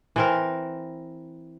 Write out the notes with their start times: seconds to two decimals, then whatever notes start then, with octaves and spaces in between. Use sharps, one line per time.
0.16 E3 C4 A#4